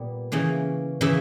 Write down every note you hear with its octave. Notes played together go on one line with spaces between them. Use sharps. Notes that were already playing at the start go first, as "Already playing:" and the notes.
Already playing: A#2 G3 B3
C#3 E3 A#3
C#3 E3 A#3 E5